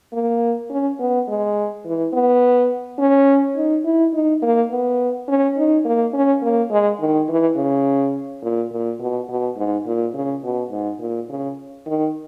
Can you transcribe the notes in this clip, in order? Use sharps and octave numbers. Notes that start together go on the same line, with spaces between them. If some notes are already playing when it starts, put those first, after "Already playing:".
A#3
C#4
B3
G#3
E3
B3
C#4
D#4
E4
D#4
A#3
B3
C#4
D#4
A#3
C#4
A#3
G#3
D#3
E3
C#3
A#2
A#2
B2
B2
G#2
A#2
C#3
B2
G#2
A#2
C#3
D#3